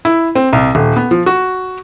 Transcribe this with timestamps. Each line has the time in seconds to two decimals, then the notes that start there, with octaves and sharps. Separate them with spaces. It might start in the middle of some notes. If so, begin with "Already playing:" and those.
0.05 E4
0.35 C4
0.53 C2
0.75 D#1
0.97 B3
1.11 F3
1.26 F#4